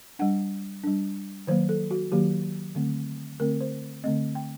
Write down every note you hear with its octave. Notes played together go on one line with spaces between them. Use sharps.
G3 D4 F#5
G3 D4
D#3 F#3 A#3 C5
A4
F#4
D#3 F#3 A#3 G4
D3 A3 C4
D3 A3 C4 A#4
C5
D3 A3 C4 D#5
G5